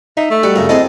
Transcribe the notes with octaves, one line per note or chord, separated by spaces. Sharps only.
D#4 E5
A3
G3 F#4
F#2 C#3 A#4
C4 E4 G#4 A4 D#5